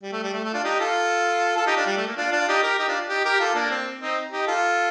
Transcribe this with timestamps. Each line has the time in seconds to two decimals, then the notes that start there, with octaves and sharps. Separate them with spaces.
0.03 G3
0.13 A3
0.23 G3
0.34 A3
0.44 A3
0.53 D4 F4
0.64 D#4 G4
0.80 F4 A4
1.56 F4 A4
1.67 D#4 G4
1.77 D4 F4
1.86 G3
1.97 A3
2.07 A#3
2.17 D4 F4
2.32 D4 F4
2.49 D#4 G4
2.63 G4 A#4
2.79 D#4 G4
2.88 D4 F4
3.09 D#4 G4
3.25 G4 A#4
3.40 F4 A4
3.55 A#3 D4
3.71 C4
4.01 C4 D#4
4.32 D#4 G4
4.47 F4 A4